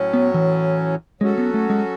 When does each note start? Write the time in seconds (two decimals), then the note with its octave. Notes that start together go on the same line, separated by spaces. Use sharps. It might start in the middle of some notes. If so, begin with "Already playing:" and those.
Already playing: A2 F#3 C#4
0.14 B3
0.34 E3
1.21 F#3 G#3 C#4 F#4 A4
1.38 B3
1.54 A3
1.70 G#3